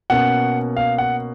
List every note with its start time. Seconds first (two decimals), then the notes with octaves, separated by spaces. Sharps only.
0.10 B2 A#3 C#4 F#5
0.77 F5
0.98 F#5